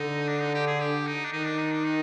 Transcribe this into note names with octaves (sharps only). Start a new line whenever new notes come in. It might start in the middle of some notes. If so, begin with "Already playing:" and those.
Already playing: D3 D#4
D4
D#4
G4
G#4
G4
D#4
D4
D#3 D#4
D4
D#4
D4
D#4